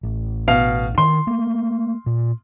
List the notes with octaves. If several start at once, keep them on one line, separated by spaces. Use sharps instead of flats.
A1
B2 F5 F7
D#3 C6
A3 A#3
A#2